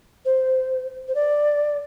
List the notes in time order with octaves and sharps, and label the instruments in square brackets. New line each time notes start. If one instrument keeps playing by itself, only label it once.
[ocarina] C5
C5
D5